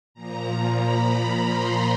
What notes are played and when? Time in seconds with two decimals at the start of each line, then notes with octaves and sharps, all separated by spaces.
0.14 A#2 F3 A#5
0.78 B5
1.43 C6